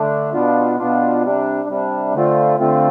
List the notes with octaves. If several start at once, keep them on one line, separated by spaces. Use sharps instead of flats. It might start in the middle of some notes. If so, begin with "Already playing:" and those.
Already playing: D3 A3 D4
B2 B3 D4 F4
B2 B3 D4 F4
C3 G3 D4
C3 G3 D4
D3 A3 C4 F4
D3 A3 C4 F4